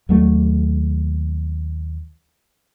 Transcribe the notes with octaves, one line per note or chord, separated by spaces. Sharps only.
D#2 F#3 A3